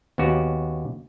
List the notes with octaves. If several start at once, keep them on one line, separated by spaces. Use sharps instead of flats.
D#2 B3 C#4 F#4 G4